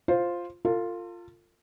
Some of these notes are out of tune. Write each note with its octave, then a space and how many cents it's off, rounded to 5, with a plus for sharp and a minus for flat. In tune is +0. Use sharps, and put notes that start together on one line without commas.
F4 +0 C5 +0
F4 +0 A4 +45